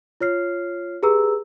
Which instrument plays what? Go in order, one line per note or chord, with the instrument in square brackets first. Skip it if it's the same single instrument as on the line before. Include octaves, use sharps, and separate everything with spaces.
[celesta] F4 C#5 F6 C7
G4 G#4 B4 A#5 E6